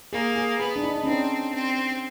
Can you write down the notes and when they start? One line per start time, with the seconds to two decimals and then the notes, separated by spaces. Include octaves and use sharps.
0.12 A#3 G#4
0.36 G#4
0.60 B3 G#4
0.76 D4
0.83 D#4
0.96 D#4
1.04 C#4
1.07 C4 D4
1.55 C4